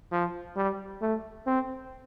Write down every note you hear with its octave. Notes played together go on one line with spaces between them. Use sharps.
F3
G3
A3
C4